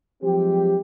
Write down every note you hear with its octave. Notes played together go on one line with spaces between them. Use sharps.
F3 F#3 G#3 C4 G4